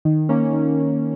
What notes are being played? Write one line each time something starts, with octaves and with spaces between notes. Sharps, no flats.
D#3
A#3 C#4
D#3